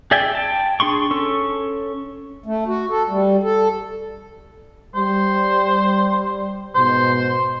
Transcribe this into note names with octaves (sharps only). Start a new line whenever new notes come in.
G#4 D5 E5 G5 G#5
G5 A5
D4 G#4 C6 C#6
C#4 A4 C#6
A3
F#4
A4
G3
A4
G3 C5
G#2 B2 C5